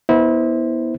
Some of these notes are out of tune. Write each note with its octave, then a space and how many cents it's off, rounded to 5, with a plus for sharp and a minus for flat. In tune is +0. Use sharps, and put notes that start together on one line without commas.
B3 -25 E4 -25 C5 -5